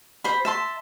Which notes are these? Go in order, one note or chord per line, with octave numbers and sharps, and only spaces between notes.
C5 B5
E5 A5 C6